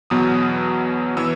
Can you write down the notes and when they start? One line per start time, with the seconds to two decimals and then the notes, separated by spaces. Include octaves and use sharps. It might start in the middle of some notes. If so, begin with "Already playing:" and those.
0.10 E2 B2 F#3 B3 D#6
1.17 E3 B3 E6